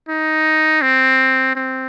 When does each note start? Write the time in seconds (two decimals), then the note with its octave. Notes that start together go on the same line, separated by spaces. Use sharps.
0.09 D#4
0.82 C4
1.56 C4